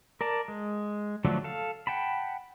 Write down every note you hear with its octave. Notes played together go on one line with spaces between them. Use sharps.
A#4 D5 A5
G#3
D3 F3 F#3 A3 D4
A4 F5
F#5 G5 A5 B5